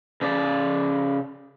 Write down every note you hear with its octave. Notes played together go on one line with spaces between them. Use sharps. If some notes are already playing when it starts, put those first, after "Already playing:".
C#3 D5